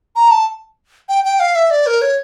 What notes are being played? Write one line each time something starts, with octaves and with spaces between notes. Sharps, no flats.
A#5
A5
G5
G5
F5
E5
D5
A#4
C#5